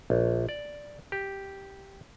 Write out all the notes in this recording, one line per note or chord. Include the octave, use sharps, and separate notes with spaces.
A#1
D5
G4